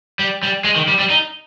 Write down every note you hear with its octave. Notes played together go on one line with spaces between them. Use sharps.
G3
G3
G#3
D#3
G3
G3
D#4